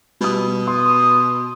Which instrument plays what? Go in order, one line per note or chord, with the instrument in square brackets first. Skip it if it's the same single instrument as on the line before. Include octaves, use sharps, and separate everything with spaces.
[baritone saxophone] B2 [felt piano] G3 D#6
[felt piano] C6 [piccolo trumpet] D#6